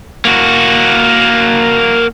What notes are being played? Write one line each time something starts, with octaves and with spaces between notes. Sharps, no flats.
A#3 F#4